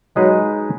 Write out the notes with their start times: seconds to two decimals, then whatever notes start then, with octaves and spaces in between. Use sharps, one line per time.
0.16 F#3 G#3 D#4 G#4 B4